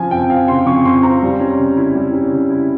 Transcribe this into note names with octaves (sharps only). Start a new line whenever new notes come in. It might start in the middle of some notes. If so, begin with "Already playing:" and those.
Already playing: C#3 F3 G#5
F2 G5
C4 F5
C#3 C6
F3 C#6
F2 C6
C4 A#5
G3
C#4
C#3
E4
G3
C#4
C#3
E4